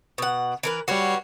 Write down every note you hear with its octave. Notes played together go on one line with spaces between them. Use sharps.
B2 F#5
E3 A#4 B4
G3 F#4 B4 C#5 C7